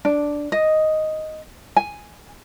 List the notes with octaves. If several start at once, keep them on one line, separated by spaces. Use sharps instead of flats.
D4
D#5
G#5